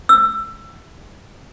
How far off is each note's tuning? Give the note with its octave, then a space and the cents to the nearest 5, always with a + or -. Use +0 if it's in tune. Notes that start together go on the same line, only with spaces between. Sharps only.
E6 +20